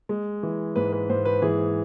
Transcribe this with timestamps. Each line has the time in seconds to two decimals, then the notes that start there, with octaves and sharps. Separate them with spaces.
0.09 G#3
0.43 E3
0.76 G#2 B4
0.93 B4
1.09 G#2 C5
1.25 B4
1.42 E3 G#4